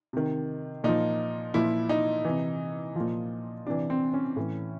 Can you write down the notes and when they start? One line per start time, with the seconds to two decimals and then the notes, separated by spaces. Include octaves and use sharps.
0.13 C3 D#3
0.84 A#2 F3 D#4
1.54 A#2 F3 E4
1.89 D#4
2.25 C3 E3
2.96 A#2 F3
3.66 C3 E3 D4
3.90 C4
4.14 C#4
4.36 A2 E3